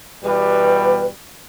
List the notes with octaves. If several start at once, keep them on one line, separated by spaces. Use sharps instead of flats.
E2 B2 G3 B4